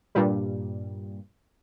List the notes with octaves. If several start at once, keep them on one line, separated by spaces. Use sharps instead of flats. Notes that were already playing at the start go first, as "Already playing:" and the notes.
G2 A#2 G3